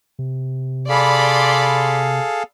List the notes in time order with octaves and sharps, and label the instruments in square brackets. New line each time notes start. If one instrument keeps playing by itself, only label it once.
[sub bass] C3
[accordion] G#4 A4 F5 [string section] D5 B5 C6